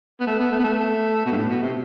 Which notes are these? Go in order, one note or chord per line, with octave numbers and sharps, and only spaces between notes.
B3
A3
B3
A3
B3
A3
B2
G2
A2
B2
C3